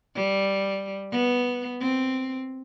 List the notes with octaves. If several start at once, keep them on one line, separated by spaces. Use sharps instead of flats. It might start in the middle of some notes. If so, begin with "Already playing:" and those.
G3
B3
C4